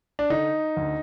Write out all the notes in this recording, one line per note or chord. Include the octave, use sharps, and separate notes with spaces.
D4
D3 D#4
D2